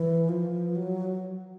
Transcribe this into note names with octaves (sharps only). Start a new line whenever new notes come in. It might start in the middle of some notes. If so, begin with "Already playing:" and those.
Already playing: E3
F3
F#3